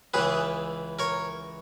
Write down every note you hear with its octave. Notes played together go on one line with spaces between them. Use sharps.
C#2 C#3 E3 G#4 B4
A#4 C#5